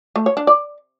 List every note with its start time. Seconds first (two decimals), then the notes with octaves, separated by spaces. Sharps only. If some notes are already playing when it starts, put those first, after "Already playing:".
0.16 A3
0.26 C#5
0.37 D4
0.47 D5